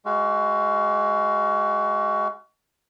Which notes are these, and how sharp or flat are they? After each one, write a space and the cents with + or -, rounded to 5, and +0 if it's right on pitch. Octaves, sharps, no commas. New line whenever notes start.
G#3 +15 F#4 +25 F5 -25